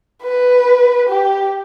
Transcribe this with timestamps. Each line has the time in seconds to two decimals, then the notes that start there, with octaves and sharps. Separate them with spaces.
0.23 B4
1.09 G4